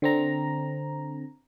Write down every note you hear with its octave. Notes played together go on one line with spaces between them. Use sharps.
D3 C4 A#5